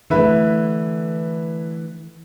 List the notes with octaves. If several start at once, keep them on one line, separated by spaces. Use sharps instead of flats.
D3 E3 A3 E4 B4